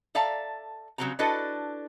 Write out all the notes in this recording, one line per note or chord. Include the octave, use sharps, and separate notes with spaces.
A4 D5 E5 F5 A5 A#5
C#3 F#3 G3 C4 F#4 A#5
D4 E4 F#4 A4 B4 D#5